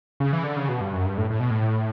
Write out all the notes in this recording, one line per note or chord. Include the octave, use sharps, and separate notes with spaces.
C#3
E3
D3
C#3
B2
G2
F#2
G2
A2
A2
B2
A2